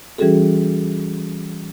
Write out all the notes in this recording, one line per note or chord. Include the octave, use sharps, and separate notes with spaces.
E3 G3 C#4 F#4 G#4 A4